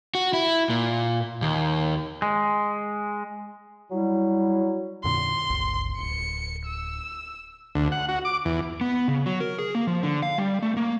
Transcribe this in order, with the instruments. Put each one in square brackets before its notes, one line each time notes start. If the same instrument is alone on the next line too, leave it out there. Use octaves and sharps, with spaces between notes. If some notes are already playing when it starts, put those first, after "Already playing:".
[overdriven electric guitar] F#4
E4
A#2
D#2
[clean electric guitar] G#3
[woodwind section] F#3 G3 E4
[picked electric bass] F2 A#2 D3 [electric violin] C6
[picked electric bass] G1 C#2
[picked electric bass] D1 [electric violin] C#7
[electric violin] E6
[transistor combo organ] D2
F#5
F#4
D6
E2
[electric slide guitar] B3
C#3
F#3
A#4
G#4
A#3
F3
D3
F5
G3
A3
A#3